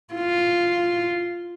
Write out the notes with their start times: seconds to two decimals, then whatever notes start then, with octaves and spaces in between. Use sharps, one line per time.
0.14 F4